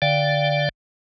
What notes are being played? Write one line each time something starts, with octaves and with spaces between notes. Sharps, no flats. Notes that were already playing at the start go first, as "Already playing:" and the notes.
D3 D5 F5 G5